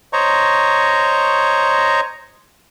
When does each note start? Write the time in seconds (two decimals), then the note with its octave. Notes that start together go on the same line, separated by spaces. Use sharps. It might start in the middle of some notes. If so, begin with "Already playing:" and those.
0.13 C5 C#5 D#5 A#5 C#6